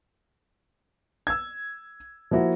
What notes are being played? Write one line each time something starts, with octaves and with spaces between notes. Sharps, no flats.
E6 G#6
F3 A#3 E4 F#4